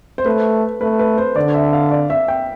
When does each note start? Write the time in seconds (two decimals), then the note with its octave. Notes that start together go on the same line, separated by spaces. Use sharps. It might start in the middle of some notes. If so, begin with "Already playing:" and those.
0.18 C5
0.26 A3 B4
0.81 A3 B4
0.99 B4
1.18 C5
1.36 D3 D5
1.54 E5
1.73 F5
1.91 D5
2.10 E5
2.28 G5